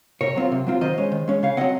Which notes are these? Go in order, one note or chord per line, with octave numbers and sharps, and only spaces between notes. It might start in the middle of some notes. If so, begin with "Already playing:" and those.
C3 A#4 C#5
F#3 C4 F4
C3
F#3 C4 F4
D#3 C5 D#5
G#3 C#4
D#3
G#3 C#4
C#3 C#5 F5
F#3 C4 D#5 F#5